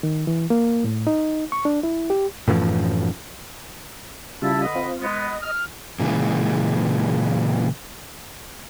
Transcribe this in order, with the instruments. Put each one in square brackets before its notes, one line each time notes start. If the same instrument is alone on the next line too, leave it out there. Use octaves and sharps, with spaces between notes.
[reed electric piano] D#3
E3
A#3
A2
D#4
C#6
D4
E4
G4
[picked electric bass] F#2 A2 E3 F3
[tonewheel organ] C#3 G3 F4 [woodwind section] E4 E5 A5
[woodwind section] D3 B4 D#5
[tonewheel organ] C4 F4
[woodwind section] G#3 B3
[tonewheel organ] D#5
[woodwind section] F6
[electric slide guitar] A#2 C#3 E3 G#3